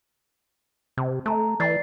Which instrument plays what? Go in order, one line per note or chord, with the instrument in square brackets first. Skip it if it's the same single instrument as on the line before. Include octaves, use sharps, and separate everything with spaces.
[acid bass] C3
[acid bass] A3 [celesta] A5 A#5
[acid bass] E3 [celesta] D5 A6 C7